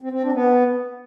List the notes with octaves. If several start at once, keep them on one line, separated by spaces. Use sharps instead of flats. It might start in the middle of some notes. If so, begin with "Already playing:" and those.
C4
C4
D4
B3